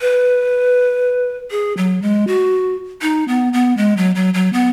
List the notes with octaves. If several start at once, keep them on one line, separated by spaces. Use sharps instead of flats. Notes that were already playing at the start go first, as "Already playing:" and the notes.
B4
G#4
F#3
G#3
F#4
D#4
B3
B3
G#3
F#3
F#3
F#3
B3